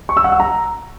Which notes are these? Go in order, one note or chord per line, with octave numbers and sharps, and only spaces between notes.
C#6
E6
F#5
E6
A#5